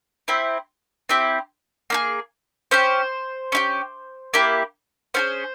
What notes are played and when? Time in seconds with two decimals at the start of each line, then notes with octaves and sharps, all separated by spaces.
0.28 C4 E4 G4
1.09 C4 E4 G4
1.90 A#3 E4 G#4
2.71 C#4 G4 C5
3.52 C#4 E4 G4
4.34 A#3 E4 G4
5.14 C#4 F4 G#4 C5